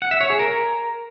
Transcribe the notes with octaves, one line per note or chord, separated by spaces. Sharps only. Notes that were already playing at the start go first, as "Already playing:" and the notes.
F#5
E5
C#5
G#4
A#4